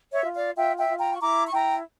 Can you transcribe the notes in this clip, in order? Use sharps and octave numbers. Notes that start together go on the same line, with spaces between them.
C#5 E5
F4
D5 F5
F4 E5 G5
E5 G5
F4
G5 A#5
C#6
E4 A#5 D6
C#6
E4 G5 A#5